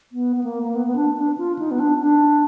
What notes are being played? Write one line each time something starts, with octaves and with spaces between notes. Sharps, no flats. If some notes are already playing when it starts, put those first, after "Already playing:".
B3
B3
A#3
A#3
B3
B3
D4
D4
F4
D#4
B3
D4
D4